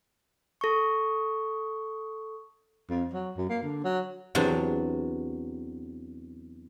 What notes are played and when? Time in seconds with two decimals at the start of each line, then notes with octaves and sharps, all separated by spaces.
0.61 A4 C#6
2.89 F2
3.13 F#3
3.37 F#2
3.49 A#3
3.62 D3
3.84 F#3
4.35 E2 C3 F#3 D4